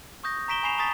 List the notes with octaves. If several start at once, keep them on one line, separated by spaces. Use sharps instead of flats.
C#6 D#6 G6 A#6
A#5 C#6 B6 D7 E7 G7
G#5 B5 C#6 C7 E7 F7
A5 A#5 C#6 D#6 A6 B6